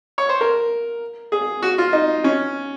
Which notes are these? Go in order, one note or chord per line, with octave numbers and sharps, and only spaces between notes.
C#5
C5
A#4
G#4
F#4
F4
D#4
C#4